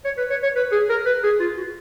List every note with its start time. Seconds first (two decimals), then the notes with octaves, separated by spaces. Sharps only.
0.05 C#5
0.18 B4
0.30 C#5
0.43 C#5
0.56 B4
0.72 G#4
0.90 A#4
1.06 B4
1.23 G#4
1.40 F4
1.57 F#4